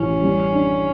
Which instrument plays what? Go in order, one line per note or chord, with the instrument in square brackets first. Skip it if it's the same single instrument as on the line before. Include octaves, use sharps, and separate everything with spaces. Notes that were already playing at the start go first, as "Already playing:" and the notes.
Already playing: [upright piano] A1 [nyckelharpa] C#4
[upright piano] G3
D4